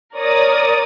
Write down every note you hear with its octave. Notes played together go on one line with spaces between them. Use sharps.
A#4 C#5 D5 D#6